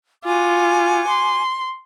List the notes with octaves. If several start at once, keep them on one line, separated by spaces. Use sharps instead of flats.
F4 F#4 G#5 D6
C6